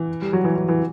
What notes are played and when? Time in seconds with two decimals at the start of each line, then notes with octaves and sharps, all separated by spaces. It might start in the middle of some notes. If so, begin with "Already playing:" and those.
Already playing: E3
0.22 G3
0.33 F#3
0.44 E3
0.56 E3
0.68 E3